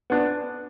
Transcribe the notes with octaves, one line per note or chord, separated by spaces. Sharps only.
B3 D4